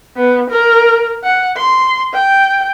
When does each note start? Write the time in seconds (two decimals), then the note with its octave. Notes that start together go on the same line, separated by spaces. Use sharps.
0.17 B3
0.50 A#4
1.24 F#5
1.57 C6
2.14 G5